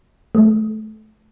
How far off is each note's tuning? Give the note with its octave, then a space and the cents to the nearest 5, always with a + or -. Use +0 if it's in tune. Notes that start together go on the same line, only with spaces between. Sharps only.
A3 -20